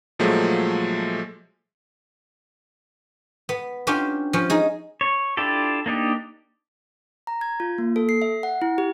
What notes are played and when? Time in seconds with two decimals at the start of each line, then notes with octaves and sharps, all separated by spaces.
0.19 A#2 F3 F#3 G#3 A3
3.49 B3
3.87 C#4 D4 F4 G4
4.33 F3 C#4
4.50 D#4 G#4
5.01 C#5
5.37 D4 E4 F4 G4 A4
5.86 A#3 D4 D#4 G4
7.27 A#5
7.41 G#6
7.60 F4
7.78 A#3
7.96 A4
8.09 C7
8.22 E5
8.43 F#5
8.62 E4
8.78 G4